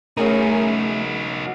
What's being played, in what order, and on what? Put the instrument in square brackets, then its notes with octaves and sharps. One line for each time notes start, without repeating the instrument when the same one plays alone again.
[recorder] A3 [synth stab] C#4 G#4 A#4 [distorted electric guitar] D#4 F#4